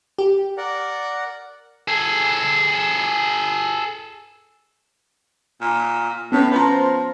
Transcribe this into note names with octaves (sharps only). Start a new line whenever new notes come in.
G4
A#4 D5 F#5
G#4 A4
A#2
A2 B3 C#4 B4
F3 B4 C5 A#5